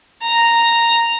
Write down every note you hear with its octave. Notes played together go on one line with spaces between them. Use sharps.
A#5